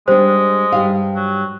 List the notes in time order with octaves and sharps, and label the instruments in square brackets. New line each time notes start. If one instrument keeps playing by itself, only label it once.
[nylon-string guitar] G3 D4 [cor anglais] G#3 [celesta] C5
[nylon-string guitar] G2 G3 F5
[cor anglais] F#3